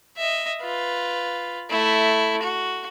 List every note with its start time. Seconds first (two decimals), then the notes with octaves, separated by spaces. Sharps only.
0.17 D#5 E5
0.62 F4 B4
1.70 A3 E4
2.43 F#4